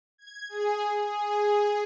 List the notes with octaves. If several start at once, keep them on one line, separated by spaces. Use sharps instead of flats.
G#6
G#4
G#4